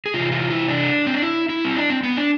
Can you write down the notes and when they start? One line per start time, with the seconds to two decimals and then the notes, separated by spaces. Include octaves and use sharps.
0.06 G#4
0.14 C3 E3 F4
0.32 F4
0.50 E4
0.68 D4
1.07 C4
1.14 D4
1.22 E4
1.49 E4
1.65 C4
1.76 D4
1.90 C4
2.03 B3
2.17 D4